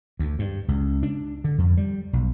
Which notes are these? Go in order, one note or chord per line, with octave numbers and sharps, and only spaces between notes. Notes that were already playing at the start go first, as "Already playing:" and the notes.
D2
G2
C#2
D4
D3
F2
G3
B1